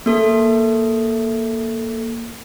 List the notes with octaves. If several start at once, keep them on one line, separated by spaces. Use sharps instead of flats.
A#3 A4